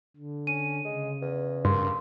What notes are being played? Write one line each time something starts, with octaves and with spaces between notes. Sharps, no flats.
D3
C#4 D#7
C#3 G#3
E2
G2 A#3 C6